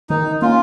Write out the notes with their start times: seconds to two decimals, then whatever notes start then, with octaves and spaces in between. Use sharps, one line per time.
0.09 D#3 D#4
0.42 A#3 C#4 F4